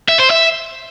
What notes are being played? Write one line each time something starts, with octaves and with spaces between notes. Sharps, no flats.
E5
C5
E5